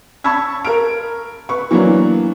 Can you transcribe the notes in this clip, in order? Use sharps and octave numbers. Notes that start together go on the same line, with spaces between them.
A5 B5 C#6 E6 G#6
A#4 F6 D7
B4 C#6
E3 F#3 A#3 B3 D4